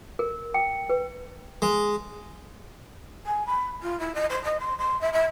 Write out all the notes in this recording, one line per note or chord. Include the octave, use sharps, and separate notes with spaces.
A#4
G5
B4
G#3
G#5
B5
F4
E4
D#5
C5
D#5
C6
C6
E5
E5